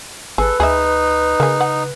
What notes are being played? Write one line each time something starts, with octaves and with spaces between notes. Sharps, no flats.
G#1 G#4 A4 B4
D2 D#4 G#4 E5
C#3 A#3 G#4
F#5